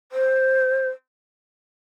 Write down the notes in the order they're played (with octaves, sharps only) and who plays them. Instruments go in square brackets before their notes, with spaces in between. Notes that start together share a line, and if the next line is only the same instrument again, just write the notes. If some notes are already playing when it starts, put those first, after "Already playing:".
[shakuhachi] C5